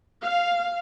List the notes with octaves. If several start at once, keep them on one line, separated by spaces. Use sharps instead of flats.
F5